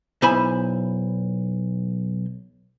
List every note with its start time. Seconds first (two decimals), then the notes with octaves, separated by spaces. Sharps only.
0.22 B1 E4 C5 G#5 B5